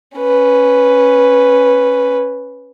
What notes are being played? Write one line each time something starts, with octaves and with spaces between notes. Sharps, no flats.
C#4 B4